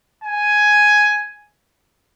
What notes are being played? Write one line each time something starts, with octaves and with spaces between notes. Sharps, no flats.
G#5